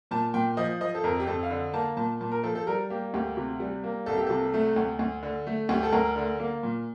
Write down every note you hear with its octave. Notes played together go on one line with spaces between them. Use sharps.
A#2 A5
A#2 G5
F3 D#5
F3 D#5
A4
F2 A#4
G4
F2 A4
F5
D3
A#3 A5
A#2 A5
A#2 A5
A#4
F3 A4
A4
G3 A#4
A#3 G4
D2 G4
C3
G3
A#3
C2 A4
G4
C3 A4
A3
D2
D2
D3
A3
D2 G4
A4
D2 A#4
D3
A#3
A#2